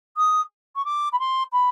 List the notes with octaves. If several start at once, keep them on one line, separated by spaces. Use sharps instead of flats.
D#6
C#6
D6
B5
C6
B5